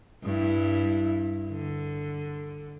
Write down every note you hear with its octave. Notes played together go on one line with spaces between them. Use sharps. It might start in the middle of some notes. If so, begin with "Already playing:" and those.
G2 E4
D3